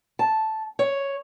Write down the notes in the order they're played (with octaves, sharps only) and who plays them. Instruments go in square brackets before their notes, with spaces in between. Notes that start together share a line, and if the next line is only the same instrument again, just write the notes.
[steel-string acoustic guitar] A5
C#5